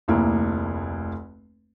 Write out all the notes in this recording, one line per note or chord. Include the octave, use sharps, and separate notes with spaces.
F1 D2 A#3 E4